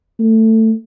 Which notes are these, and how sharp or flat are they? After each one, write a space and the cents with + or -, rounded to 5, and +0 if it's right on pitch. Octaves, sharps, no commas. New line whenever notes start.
A3 +15